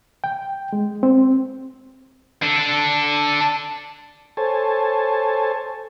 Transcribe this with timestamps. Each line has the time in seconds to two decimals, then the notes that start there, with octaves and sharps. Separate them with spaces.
0.24 G5
0.73 G#3
1.03 C4
2.43 D4 A4
4.37 A4 C5 C#5 G#5 A5